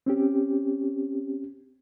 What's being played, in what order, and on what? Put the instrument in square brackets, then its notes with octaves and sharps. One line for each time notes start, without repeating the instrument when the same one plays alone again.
[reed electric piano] C4 C#4 G4